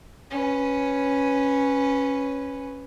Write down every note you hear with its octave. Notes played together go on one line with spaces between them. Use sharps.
C#4 B4